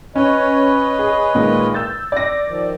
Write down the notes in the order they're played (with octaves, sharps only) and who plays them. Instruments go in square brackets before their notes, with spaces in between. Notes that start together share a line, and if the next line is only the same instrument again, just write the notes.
[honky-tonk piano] C#4 [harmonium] B4 C#5 D#5
[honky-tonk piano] G#4
A#2 D#3 G#3
E6 G6 A6
D5 A#6
[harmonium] D#3 F3